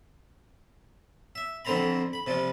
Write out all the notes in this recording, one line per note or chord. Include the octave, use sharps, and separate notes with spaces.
E5
F2 D3 C4 C5 A#5 B5
B5
C3 F3 G3